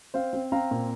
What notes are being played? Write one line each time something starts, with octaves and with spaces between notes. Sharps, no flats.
C4 C5 F5
C4
C4 F5 A#5
A#2